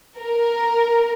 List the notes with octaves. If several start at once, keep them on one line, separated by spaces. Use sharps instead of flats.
A#4